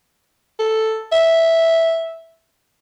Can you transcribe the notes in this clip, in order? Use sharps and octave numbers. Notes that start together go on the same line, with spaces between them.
A4
E5